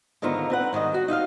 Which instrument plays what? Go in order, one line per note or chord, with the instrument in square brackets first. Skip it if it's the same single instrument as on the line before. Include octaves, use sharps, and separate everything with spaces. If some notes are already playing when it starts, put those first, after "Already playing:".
[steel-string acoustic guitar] G#2 D3 D#3 B3 F4 A#5
C4 B4 F#5
G#2 D#3 G3 D#5
F#4
D#4 F4 E5 F5